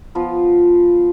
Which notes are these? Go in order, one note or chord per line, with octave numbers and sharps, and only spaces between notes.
F3 B3 F4